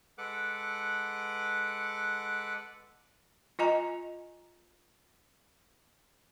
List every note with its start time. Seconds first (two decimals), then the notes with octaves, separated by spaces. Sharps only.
0.18 G#3 A4 B4 F#5 D6 F#6
3.59 F4 D#5 G#5 A#5